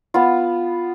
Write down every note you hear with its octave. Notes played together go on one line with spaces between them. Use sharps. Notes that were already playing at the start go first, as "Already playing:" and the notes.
B3 F4